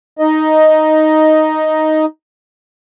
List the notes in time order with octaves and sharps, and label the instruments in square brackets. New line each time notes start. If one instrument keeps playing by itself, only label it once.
[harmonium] D#4 D#5